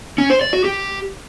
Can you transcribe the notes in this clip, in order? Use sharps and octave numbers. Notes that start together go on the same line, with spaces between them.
C#4
C5
D5
F#4
G4